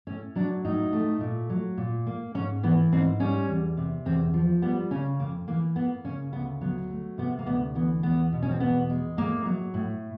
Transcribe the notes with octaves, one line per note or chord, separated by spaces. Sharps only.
A2 C#4
F#3 D4
A2 D#4
A3
A#2
F#3
A#2
A#3
G#2 C#4
E3 B3
G#2 C4
G3 C#4
E2
C3
E2 C4
F3
G3 B3
C#3 C#4
F2 A#3
E3 A#3
A#3 B3
C#3 C#4
D2 B3
F#3 B3
A3
C3 B3
A#3
D2 B3
E3 B3
E2 B3
B2
C#4
C4
E2 B3
G#3
A2 A#3
F#3
A2